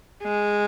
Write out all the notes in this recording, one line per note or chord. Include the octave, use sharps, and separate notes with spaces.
G#3